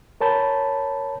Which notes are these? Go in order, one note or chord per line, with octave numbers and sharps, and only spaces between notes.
A#4 C#5 A5 B5 G6